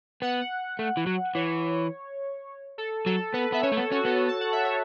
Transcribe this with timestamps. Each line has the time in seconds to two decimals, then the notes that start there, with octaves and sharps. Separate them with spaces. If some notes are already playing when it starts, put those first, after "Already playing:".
0.22 B3 F#5
0.79 A3
0.97 E3
1.07 F#3
1.35 E3 C#5
2.78 A4
3.06 F#3 A4
3.34 B3 B4
3.52 B3 E5
3.63 C#4 C#5
3.72 A3
3.77 B3 A4
3.91 C#4 F#4
4.05 B3 A4
4.28 A5
4.41 F#5
4.52 E5
4.65 C#5